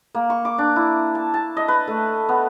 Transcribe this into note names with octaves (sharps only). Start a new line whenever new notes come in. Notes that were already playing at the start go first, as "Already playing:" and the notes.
A#3
C#6
D6
D4
E4
A5
A5
D#5
B4
A3
B3